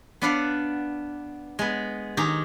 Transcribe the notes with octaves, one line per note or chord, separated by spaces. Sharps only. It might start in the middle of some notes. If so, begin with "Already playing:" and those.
B3 D4 B4 D5 F5 F#5
G#3 B3
D#3 G4 G#4 A#5